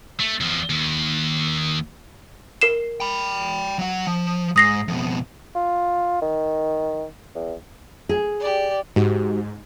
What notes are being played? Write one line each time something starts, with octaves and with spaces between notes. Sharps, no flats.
A3
E2 F3
D#2
A#4 C7 E7
G5 B5
F#3 F#5
F3
G#2 D#6 A#6 C7
F2 B2
F4
D#3
E2
G#4
G4 D5
G#2 G#3 F#4 G4